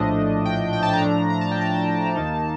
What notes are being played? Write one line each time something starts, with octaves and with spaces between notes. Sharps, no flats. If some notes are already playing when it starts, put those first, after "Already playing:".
Already playing: A#1 A2 F3 A3 D4 D#5
G5
G5
A5
A#5
A2 F3 A3 D4
A#5
A5
G5
A5
D#2 D#3 A#3 D#4